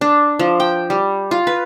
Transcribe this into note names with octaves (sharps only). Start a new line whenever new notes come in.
D4
F3
G5
G3
F4
B4